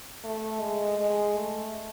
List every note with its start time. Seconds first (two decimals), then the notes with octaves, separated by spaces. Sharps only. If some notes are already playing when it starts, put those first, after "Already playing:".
0.24 A3
0.61 G#3
0.99 G#3
1.37 A3